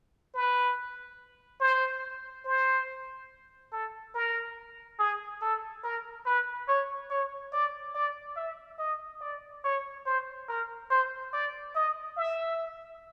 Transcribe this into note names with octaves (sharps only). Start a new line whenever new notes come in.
B4
C5
C5
A4
A#4
G#4
A4
A#4
B4
C#5
C#5
D5
D5
E5
D#5
D5
C#5
C5
A#4
C5
D5
D#5
E5